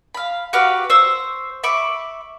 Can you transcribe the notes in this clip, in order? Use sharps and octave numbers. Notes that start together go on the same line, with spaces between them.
F5 B5
F#4 G4 B4 F5
C5 C#6 E6
E5 B5 C#6 D6